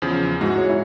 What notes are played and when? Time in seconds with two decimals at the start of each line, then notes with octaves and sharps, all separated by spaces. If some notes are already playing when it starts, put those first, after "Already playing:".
0.02 E2 C#3 F3
0.41 G#2 G#3 E4 F#4
0.57 C#5
0.69 E4